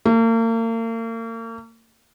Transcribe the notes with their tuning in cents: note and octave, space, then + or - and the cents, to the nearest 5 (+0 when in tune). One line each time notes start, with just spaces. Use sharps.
A#3 -40